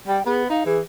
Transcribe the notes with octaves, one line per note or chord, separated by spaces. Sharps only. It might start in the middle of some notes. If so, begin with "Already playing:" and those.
G3 G5
B3 G#4
D#4 F5
E3 G#4